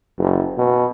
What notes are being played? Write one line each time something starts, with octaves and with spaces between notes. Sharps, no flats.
F#1
B2